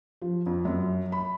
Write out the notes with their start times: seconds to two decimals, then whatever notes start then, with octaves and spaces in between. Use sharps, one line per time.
0.21 F3
0.46 F2
0.65 F#2
1.12 B5